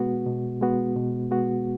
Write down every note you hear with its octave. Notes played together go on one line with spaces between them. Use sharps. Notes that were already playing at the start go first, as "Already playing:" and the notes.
Already playing: B2 G#3 B3 F#4
B2
G#3 B3 F#4
B2
G#3 B3 F#4